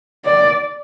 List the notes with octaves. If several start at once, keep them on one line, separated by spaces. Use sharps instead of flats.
D5